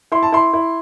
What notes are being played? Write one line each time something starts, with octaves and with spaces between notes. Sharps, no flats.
E4 C6
A5
E4 C6
E4